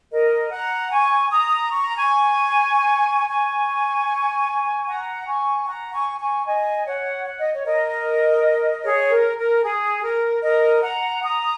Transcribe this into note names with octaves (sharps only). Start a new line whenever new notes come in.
A#4 D#5
F#5 A#5
G#5 C#6
A#5 D#6
C#6
A#5
G#5 C#6
G#5 C#6
F#5 A#5
G#5 C#6
F#5 A#5
G#5 C#6
G#5 C#6
D#5 G#5
C#5 F#5
F#5
D#5
C#5
A#4 D#5
G#4 C#5
A#4
A#4
G#4
A#4
A#4 D#5
F#5 A#5
A#5 D#6